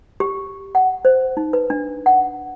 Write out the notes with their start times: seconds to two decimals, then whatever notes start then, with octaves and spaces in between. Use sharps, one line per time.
0.20 G4
0.75 F#5
1.05 C5
1.37 D#4
1.53 B4
1.70 D4
2.06 F#5